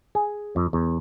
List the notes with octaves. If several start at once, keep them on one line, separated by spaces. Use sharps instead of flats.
G#4
F2
E2